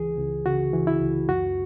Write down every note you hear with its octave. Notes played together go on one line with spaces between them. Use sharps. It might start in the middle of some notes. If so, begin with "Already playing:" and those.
Already playing: C#2 E3 G#4
C#2
C#3 F#4
E3
E4
C#2
F#2 F#4